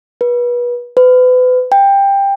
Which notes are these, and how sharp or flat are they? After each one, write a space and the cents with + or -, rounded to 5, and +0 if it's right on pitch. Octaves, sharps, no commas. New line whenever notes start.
B4 -30
B4 +35
G5 +15